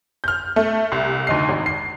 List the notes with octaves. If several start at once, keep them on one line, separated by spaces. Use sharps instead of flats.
F6 G6
A3
C2
D2 D#4 C7
G#1
C7